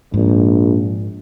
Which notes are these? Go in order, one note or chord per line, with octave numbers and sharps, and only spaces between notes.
A#1 G#2